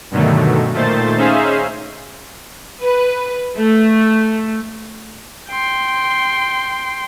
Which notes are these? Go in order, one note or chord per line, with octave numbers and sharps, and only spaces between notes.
G2 B2 D3 D#3 F#3 A3
A#2 D#3 A3 C5 A6
C#4 D#4 G#4 C5 E5 F5
B4
A3
G5 C6